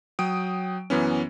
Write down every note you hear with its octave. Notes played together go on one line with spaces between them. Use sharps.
F#3 G5 D#6 D7
F#2 E3 B3 C#4